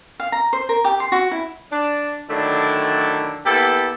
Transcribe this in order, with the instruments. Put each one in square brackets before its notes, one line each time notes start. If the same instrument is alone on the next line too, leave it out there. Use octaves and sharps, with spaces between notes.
[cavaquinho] F5
A#5
C5
A#4
G4
C6
F#4
E4
[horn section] D4
D3 D#3 F#3 A3 D4 E4
A#3 B3 E4 G4 A4